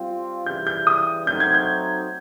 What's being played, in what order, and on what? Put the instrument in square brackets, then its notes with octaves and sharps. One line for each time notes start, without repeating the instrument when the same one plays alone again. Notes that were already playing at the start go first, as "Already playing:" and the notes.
Already playing: [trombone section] G3 C4 F4
[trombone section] C#3 E3 G3 [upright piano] G6
[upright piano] G6
D#6
[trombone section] F#3 A3 C4 D#4 F#4 [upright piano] G6
[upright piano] G#6
G6